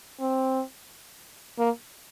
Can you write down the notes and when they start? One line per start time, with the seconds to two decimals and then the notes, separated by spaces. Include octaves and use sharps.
0.20 C4
1.59 A#3